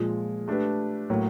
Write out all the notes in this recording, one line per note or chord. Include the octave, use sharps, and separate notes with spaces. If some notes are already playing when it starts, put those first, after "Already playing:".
Already playing: A#2 F3 G#3
A3 D4 G4 B4
A2 F#3 A#3